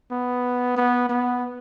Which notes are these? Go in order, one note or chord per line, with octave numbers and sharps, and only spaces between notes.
B3
B3
B3